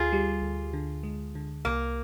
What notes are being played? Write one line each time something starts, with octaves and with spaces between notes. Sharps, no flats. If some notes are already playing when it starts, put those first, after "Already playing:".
Already playing: D2 F4 G#4
G3
D2
D3
G#3
D3
C2 A#3